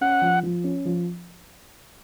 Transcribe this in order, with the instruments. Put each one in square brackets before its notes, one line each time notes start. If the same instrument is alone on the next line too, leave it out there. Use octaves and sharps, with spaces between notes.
[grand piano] C#4 [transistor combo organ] F#5
[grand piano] F3
F3
C#4
F3